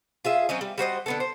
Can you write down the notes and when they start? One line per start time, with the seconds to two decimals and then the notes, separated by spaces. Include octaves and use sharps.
0.25 F4 G#4 E5
0.49 F#3 C4 C#4 D#5
0.61 G3
0.78 G3 F#4 C5 D#5
1.06 D3 B3 A4
1.20 C5